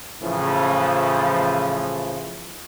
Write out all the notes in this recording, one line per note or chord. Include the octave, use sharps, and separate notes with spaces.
A2 C#3 E3 F3